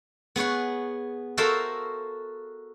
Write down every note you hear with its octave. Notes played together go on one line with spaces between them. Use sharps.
B3 G#4 C#5 F#5
F#4 A4 A#4 C5 E5 F5